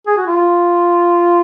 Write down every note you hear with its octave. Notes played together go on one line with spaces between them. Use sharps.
G#4
F#4
F4